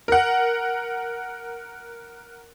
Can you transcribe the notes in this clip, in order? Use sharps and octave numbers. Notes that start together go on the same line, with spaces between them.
A#4 F#5